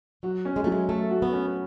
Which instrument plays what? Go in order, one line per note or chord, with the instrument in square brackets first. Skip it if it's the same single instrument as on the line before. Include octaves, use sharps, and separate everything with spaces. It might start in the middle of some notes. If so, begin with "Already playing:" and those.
[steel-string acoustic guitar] F#3 [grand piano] F#4
[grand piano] C#4
[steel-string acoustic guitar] G#3
[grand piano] F#3 [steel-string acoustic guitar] A3
[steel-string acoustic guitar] G#3
[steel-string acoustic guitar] A3 [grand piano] A4
[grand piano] F#4
[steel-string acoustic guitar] B3
[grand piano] C#4